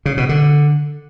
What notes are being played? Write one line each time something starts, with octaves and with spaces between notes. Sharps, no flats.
C#3
B2
D3